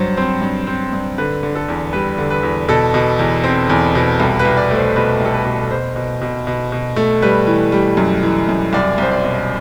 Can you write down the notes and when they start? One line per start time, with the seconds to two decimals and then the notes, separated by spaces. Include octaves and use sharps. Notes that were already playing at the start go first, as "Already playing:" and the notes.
Already playing: G2 F#3 C5
0.17 C4
0.42 G2
0.67 C4
0.93 G2
1.18 D3 B4
1.43 D3
1.55 A4
1.69 E2
1.93 G3 B4
2.18 D3
2.30 B4
2.43 E2
2.69 B2 A4
2.94 B2
3.19 E2
3.44 C4
3.70 E2
3.95 B2
4.20 C2 A4
4.39 B4
4.45 C2
4.57 D5
4.71 A3
4.77 C5
4.96 B2 B4
5.20 C2
5.25 A4
5.34 B4
5.45 B2
5.71 B2 C5
5.96 B2
6.22 B2
6.47 B2
6.72 B2
6.96 A3
7.22 G3 B4
7.47 E3
7.72 G3
7.97 F#2
8.23 E3
8.49 F#2
8.73 C2 D5
8.98 C2 C5
9.11 D5
9.23 B2